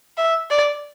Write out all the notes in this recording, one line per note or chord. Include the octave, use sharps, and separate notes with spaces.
E5
D5